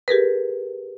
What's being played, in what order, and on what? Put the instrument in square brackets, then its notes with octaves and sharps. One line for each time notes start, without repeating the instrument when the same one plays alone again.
[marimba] G4 G#4 A#4 B4